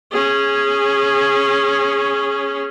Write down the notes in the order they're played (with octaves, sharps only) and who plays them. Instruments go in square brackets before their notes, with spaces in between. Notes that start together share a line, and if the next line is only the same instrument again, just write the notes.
[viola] C#4 G#4